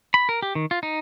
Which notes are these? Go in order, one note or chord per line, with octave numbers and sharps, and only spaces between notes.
B5
A#4
G4
D#3
F4
D#4